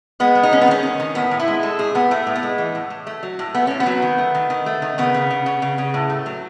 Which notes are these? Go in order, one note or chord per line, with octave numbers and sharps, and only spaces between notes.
G#3 B3
G#3
D#4
G#3 C#4
B3
D#3 C#4
D#3
D#3
A2 B3
A2
E4
G#3
G#3 A4
A2 G#4
A2 B3
A2 A3
A2
B3
G#3
E3
A2
A2
A3
F#3
A2
A3 B3
A2 C#4
B3
F#3
D#3
A3
D#3
D#3
A3
D#3
C#3 B3
C#3
C#3
C#3
C#3
C#3
A2
A3
F#3